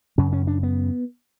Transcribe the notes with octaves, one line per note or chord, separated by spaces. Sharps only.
F#2 C#3 C#4
C#4
D4
B3